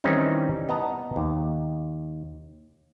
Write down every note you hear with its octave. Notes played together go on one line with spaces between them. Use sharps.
D#3 E3 G3 C4 C#4 D#4
B3 D#5 A5 A#5
D#2